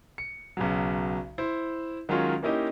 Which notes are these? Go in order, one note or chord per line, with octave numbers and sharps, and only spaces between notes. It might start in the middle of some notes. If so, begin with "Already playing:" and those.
C#7
B1 C#3 F#3
E4 C5
D#3 F#3 G#3 C#4 F4 C#5
A#3 C#4 D#4 E4 G4 D#5